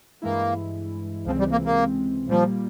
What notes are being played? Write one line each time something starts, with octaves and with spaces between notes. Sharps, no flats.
G2 E3 G#3 A#3 E4
C#2 C3 E3 F3 G#3 C4
G3
A#3
A#3
A#2 F3 G3 A#3